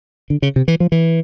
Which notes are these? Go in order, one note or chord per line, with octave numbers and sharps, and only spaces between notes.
D3
C#3
C3
E3
F3
E3